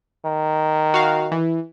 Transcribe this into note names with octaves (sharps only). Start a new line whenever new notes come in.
D#3
F#4 F5
E3